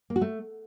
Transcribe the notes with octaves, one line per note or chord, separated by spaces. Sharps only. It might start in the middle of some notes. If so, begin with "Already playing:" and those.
A#3
F#4
A3